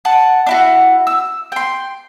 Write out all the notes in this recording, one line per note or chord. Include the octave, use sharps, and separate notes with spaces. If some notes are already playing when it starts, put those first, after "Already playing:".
F#5 A5
D4 E4 F#4
E6
G5 C6